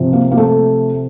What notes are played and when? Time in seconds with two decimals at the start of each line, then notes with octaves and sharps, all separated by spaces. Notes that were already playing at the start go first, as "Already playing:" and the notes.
Already playing: C3 F3
0.13 A#3
0.31 A#3
0.37 A3